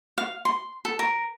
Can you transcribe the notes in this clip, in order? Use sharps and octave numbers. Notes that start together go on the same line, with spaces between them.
F5
C6
A4
A#4